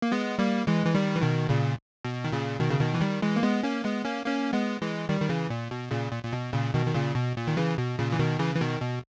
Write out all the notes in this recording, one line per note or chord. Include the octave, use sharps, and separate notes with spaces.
A#3
G#3 B3
G3 A#3
E3 G#3
E3
D#3 G3
E3
B2 D#3
A#2 C#3
B2
D#3
A#2 C#3
B2 D#3
C#3
B2 D#3
E3
D#3 G3
E3 G#3
A#3
G#3 B3
A#3 C#4
G#3 B3
A#3 C#4
A#3 C#4
G#3 B3
E3 G#3
D#3 G3
D#3
C#3 E3
A#2
B2
A#2 C#3
A#2
A#2
B2
A#2 C#3
B2 D#3
D#3
A#2 C#3
B2
A#2
D#3
C#3 E3
B2
A#2 C#3
E3
B2 D#3
C#3 E3
E3
B2 D#3
B2